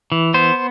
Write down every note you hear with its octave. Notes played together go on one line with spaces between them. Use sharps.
E3
B3 C5